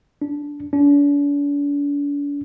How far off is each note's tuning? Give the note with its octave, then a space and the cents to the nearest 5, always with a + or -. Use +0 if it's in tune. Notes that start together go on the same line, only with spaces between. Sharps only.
D4 -15
D4 -45